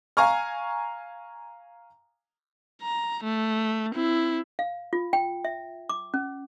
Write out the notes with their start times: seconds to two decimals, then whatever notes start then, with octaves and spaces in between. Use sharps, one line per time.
0.17 F5 G#5 A#5 C#6 F6
2.82 A#5
3.24 A3
3.94 C4 E4
4.59 F5
4.93 F4
5.13 G5
5.45 E5
5.89 D6
6.14 C#4